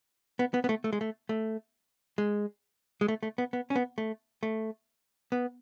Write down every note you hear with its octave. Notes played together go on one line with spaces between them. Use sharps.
B3
B3
B3
A3
A3
G#3
A3
A3
G#3
G#3
A3
A3
B3
B3
C#4
B3
A3
A3
B3